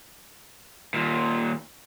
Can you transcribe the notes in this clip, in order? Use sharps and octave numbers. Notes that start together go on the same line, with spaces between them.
D#2 A#2